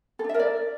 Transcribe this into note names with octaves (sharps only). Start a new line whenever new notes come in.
A4
D4
E5
A#4
D5